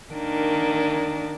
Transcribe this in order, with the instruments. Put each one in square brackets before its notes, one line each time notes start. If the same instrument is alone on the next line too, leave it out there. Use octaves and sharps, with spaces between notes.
[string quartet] D#3 A#3 D4